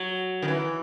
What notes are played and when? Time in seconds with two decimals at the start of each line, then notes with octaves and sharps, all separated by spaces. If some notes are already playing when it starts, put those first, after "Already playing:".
Already playing: F#3
0.42 D#3
0.48 E3